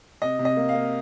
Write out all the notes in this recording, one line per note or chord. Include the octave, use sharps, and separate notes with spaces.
C3 D#5
C3
D#5
A#3
F5
A#3